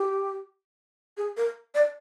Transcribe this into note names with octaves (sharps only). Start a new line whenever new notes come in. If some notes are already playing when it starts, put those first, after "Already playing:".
Already playing: G4
G#4
A#4
D5